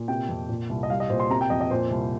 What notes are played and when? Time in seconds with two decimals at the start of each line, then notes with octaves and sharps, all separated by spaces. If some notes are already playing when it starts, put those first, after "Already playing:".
Already playing: A#2
0.08 C3 G5
0.29 F2
0.49 A#2
0.70 C2
0.83 D#5
0.90 G3 F5
1.00 D#5
1.09 A#2 C5
1.20 C6
1.30 C3 A#5
1.41 G5
1.50 F2 D#5
1.61 D#5
1.70 A#2 C5
1.91 C2